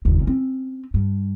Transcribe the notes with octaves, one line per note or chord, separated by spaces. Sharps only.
F#1 D#2
C4 C#4
G2